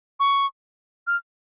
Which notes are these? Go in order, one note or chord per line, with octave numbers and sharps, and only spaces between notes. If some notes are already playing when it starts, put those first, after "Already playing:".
C#6
F6